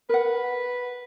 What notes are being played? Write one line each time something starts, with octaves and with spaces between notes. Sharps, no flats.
A#4 B4 F#5